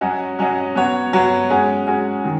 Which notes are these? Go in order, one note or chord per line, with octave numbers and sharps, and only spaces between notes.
F#3 C#4 F#4 D#5
F#3 C#4 F#4 D#5
F#3 B3 F#4 C#5
F#3 B3 F#4 C#5
G#3 C#4 F#4
G#3 C#4 F#4
D#3